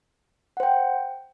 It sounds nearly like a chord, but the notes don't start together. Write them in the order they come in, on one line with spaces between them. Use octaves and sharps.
F#5 C5 G5